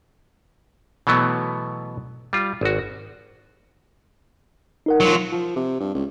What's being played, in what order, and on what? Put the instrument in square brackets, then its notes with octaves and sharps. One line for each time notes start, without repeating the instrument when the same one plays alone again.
[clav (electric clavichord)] B2 E3 F#3 A3 B3
G3 F4
G#1 F#4
[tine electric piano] D#4 A#4 F#5
[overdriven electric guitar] F#3 F4
[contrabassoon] F3
C3
G2
C#2